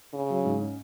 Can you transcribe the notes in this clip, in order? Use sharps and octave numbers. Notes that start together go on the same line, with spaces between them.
C#3 C#4
F#3
G#2
C#4